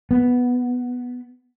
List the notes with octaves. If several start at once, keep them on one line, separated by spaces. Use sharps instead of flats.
B3